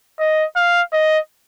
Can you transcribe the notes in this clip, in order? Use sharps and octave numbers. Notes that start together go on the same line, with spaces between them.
D#5
F5
D#5